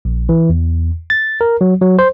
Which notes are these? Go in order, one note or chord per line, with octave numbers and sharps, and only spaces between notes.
A#1
E3
E2
A6
A#4
F#3
F#3
C5